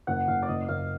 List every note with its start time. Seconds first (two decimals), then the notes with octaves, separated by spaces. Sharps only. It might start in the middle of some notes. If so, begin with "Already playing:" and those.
0.07 F#1 F#5
0.28 F#1 F5
0.42 D5
0.48 F#1 D#5
0.68 F#1 F5